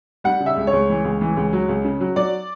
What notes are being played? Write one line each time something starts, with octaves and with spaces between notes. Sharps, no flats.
G3 F#5
C#3
E5
C#2
C#5
C#2
E3
C#2
E3
C#2
F#3
C#2
C#3
F#3
F#3 D5